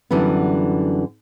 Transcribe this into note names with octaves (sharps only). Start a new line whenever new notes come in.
F#2 D3 E3 G3 B3